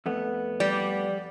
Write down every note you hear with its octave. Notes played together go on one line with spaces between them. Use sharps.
F2 A3 B3
G3 D5